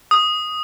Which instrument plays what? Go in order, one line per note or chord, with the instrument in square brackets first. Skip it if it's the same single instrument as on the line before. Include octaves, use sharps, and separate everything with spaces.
[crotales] D#6